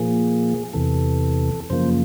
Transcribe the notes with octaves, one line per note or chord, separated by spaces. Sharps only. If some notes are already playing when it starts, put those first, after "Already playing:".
Already playing: A#2 F3 A#3 G#4
E2 C3 E3 A4
F#2 C#3 F3 A#3 C5